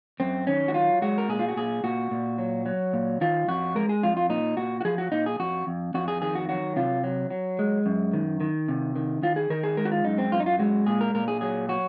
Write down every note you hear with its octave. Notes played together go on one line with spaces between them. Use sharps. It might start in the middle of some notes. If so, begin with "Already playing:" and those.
F#2 C4
D#3 C#4
F#4
F#3 F4
G#3 F#4
A#4
A#2 G#4
F4
F#4
A#2 G#4
A#2 F#4
A#2
F#3
F#3
A#2
D#3 F4
F2 F#4
G#3 A#4
G#4
F2 F4
F4
A#2 D#4
A#2 F#4
F#4
F3 G#4
F#4
A#2 D#4
G#4
F2 F#4
F2
F2 F#4
G#4
D#3 G#4
F#4
F#3 F#4
C3 F4
F#3
F#3
G#3
F#2
D#3
D#3
C3
D#3
D#3 F4
G#4
D#3 A#4
G#4
G#3 A#4
F#4
F4
F#2 D#4
C4
F#2 F4
D#4
F4
G#3 F#4
A#2 G#4
A#4
A#2 A#4
G#4
F#3 G#4
F#3 F#4